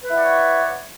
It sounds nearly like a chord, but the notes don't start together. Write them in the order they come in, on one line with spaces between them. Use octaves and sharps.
B4 E4 F#5 D5 C#5